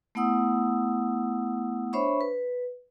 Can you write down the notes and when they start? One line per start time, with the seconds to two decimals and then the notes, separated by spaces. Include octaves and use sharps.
0.15 A3 B3 E4 F#5 D#6 E6
1.93 D4 C5 C#5 E5 B5 C#6
2.21 B4